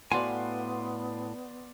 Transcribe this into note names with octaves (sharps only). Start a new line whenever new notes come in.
A2 B3 F#4 B4 D5 F5 G#5 C6